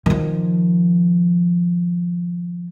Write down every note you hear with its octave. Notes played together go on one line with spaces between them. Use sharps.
D#3 F3